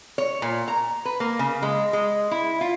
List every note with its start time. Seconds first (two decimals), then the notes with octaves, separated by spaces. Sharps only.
0.18 C#5
0.42 A#2
0.68 A#5
1.05 B4
1.20 A#3
1.39 C#3
1.62 G#3
1.93 G#3
2.31 E4
2.61 F4